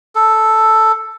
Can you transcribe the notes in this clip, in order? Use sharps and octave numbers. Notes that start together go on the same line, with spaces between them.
A4